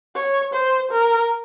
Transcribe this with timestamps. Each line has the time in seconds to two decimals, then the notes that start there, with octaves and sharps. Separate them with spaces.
0.16 C#5
0.53 C5
0.92 A#4